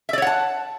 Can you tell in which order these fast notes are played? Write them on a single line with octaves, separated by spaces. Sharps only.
E5 D5 C#5 F#5 A5